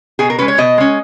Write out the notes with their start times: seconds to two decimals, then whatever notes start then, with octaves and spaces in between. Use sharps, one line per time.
0.19 B2 G#4
0.30 A#4
0.39 G#3 C#4 B4
0.48 C#5
0.58 B2 D#5
0.78 G#3 C#4